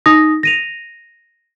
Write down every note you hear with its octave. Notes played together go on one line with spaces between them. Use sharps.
D#4 D#6 A#6
A#6 D#7 F7